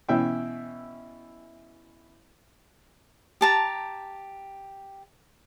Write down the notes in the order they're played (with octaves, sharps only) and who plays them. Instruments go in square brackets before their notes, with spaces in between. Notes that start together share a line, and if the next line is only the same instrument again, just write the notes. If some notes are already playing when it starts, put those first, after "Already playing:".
[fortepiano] B2 E3 C#4 E4 E5 G5
[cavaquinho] G4 A5 A#5